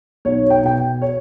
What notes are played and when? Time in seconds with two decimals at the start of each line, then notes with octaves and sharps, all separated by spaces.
0.25 B1 C#5
0.50 G5
0.63 B2 G5
1.02 C#5